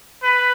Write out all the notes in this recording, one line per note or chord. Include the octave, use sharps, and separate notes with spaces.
B4